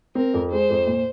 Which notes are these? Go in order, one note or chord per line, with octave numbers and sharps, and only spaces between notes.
C4 A#4
F2
G#3 C5
F2
A#2